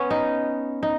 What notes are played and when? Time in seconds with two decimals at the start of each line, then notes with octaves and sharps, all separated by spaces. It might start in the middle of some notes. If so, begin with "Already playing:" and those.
Already playing: B3 C#4
0.10 D#4
0.83 D#4